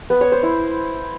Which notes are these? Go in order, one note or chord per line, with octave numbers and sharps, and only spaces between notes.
B3
C#5
C5
E4